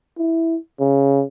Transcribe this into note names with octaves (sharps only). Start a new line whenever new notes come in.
E4
C#3